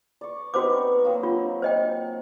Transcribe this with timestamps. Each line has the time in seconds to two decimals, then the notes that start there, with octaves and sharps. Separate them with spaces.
0.21 D5 C#6
0.54 B3 C4 D#4 F#4 C5 D6
1.04 F#3 A#3 C4
1.23 F4
1.62 C5 D#5 G5